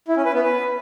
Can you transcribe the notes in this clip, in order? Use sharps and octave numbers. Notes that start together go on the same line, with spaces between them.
E4
C#4
B4
B3
B4